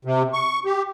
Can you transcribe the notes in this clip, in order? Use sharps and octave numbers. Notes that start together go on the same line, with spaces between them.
C3
C#6
G4